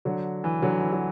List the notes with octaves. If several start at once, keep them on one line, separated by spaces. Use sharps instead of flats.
D3 F#3
E3
D3 F#3
E3
F#3